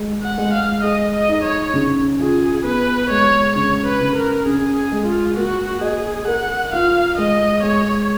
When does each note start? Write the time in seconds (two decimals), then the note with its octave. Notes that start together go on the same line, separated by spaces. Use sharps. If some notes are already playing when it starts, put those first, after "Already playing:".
Already playing: G#3
0.23 F#5
0.38 G#3
0.53 F5
0.83 G#4 D#5
1.14 D#5
1.28 D#4
1.43 C#5
1.74 C#3
2.20 F4 G#4
2.64 B3 B4
3.10 G#3 C#5
3.55 C#3 C#5
3.86 B4
4.01 C#3
4.15 A#4
4.46 C#4 G#4
4.76 G#4
4.92 G#3
5.06 F4
5.36 A#3 F#4
5.81 G#4 D#5
6.27 A#4 F#5
6.73 F4 F5
7.18 G#3 D#5
7.63 G#3 C#5